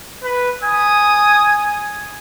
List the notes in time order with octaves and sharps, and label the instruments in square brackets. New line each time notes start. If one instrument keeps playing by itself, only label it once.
[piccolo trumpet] B4
[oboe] G#5 [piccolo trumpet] D#6